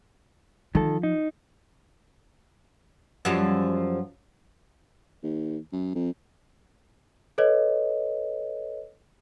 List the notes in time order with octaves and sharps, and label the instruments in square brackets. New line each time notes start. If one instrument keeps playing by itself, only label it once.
[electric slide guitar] D#3 A4 [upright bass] F3
[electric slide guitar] D#4
[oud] F#2 F3 G3
[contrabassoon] D#2
F#2
F2
[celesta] A4 B4 C#5 D#5